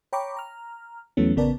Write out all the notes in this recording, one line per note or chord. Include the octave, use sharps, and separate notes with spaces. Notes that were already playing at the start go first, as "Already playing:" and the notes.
C#5 G5 A#5 B5 C#6 D6
A#5 F6
E2 E3 F#3 A3 B3 C#4
A1 C#3 B3 A#4 D5 A5